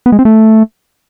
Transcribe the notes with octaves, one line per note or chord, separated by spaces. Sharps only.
B3
G#3
C4
A3